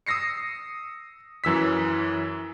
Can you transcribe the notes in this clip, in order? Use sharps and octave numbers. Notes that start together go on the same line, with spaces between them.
D#6 E6 A#6 C7 C#7
F#2 E3 E6 B6